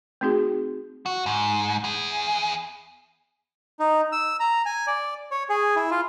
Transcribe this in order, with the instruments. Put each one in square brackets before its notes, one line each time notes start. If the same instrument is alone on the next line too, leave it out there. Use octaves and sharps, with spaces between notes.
[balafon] A3 C4 D#4 F#4 G#4
[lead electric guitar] F#4
G#2
E2 G#4
[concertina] D#4
E6
A#5
G#5
D5
C#5
G#4
E4
F4